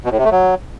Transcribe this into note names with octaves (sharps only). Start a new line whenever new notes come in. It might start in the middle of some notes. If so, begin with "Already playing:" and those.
B2
A2
C3
A3
F#3